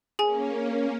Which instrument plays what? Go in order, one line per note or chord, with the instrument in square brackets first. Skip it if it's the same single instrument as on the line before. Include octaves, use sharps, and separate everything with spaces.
[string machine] A#3 C#4 [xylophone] G#4 G#5